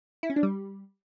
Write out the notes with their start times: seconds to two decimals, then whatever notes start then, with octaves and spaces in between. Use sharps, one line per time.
0.23 E4
0.30 C#4
0.36 D4
0.43 G3